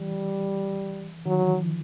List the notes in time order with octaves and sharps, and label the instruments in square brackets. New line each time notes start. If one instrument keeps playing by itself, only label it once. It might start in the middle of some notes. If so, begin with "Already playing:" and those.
Already playing: [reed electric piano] E3 [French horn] G3
[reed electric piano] D#3 [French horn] F#3
[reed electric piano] E3
F3